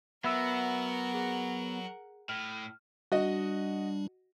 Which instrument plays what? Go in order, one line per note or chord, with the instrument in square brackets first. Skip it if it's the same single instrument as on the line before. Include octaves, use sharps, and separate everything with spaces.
[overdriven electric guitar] F#3 [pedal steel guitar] B3 [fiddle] A#4 F#5 [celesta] E5 B5 E6
[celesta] G#4
[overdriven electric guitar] A2 [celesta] F6
[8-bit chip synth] G3 D4 [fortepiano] F#4 D#5